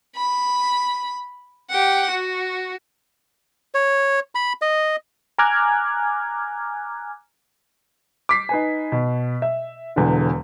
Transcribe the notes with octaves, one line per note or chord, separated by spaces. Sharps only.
B5
G4 F#5
F#4
C#5
B5
D#5
G#5 A#5 D6 F6 F#6 G#6
D6 B6 C7
D#4 B4 G#5
B2
E5
E1 E2 D3